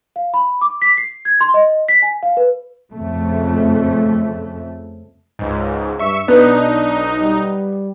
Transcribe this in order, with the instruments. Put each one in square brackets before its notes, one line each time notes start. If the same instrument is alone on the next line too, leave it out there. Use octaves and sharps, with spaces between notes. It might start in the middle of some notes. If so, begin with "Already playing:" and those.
[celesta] F5
B5
D6
B6
C7
G#6
C6
D#5
B6
G#5
F5
B4
[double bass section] F2 C#3 A3
[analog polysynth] C#2 G#2
[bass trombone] G2 [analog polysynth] E5 C#6
[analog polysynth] B1 D#4 [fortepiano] B3 [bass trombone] D4
[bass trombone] G3